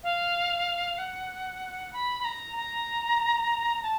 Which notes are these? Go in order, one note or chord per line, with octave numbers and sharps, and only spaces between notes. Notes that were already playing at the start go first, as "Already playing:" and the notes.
F5
F#5
B5
B5
A#5
A#5
A5